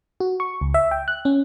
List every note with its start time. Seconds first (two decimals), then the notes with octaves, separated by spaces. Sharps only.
0.20 F#4
0.40 C#6
0.61 C#2
0.74 E5
0.91 G5
1.08 F#6
1.25 C#4